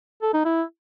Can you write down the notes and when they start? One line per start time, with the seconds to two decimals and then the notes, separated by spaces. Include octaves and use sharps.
0.22 A4
0.34 D#4
0.45 E4